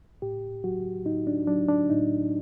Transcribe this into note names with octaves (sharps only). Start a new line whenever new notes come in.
A2 G4
F#3 F#4
A2 D#4
D4
F#3 D4
D4
A2 D#4